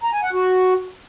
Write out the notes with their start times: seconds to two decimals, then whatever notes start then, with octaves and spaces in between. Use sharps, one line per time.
0.03 A#5
0.13 G#5
0.23 F#5
0.33 F#4